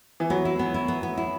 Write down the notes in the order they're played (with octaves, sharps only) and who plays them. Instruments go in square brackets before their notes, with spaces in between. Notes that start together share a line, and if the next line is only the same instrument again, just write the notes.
[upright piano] E3
[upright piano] F#3 [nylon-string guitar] B3
[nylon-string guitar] E4
B3
E4
B3
B3
E4